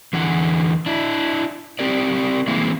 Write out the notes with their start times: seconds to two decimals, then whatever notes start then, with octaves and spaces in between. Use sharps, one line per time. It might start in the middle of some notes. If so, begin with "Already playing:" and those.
0.13 E2 D3 E3 F#5
0.86 D4 E4
1.79 C4 G4 A#4 D5
2.48 E3 G#3 A#3 C4 E4